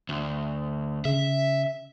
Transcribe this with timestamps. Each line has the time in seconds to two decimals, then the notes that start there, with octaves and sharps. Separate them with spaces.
0.09 D2
1.05 C#3 E5